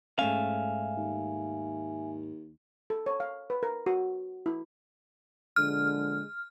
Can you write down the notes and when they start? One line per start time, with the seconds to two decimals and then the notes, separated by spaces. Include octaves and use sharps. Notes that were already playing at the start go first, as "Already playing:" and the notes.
0.19 G#2 A3 C#4 E5 F5 G#5
0.97 D#2
2.90 A4
3.06 C#5
3.20 F5
3.50 B4
3.63 A#4
3.86 F#4
4.46 E4
5.56 A#1 D3 G#3 F6